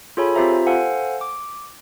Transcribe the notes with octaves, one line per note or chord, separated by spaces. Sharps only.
F4 G#4 A4 C#5 G#5 B5
C4 F4 G4 C5 E5 A#5
A4 C5 F5 F#5 G#5
D6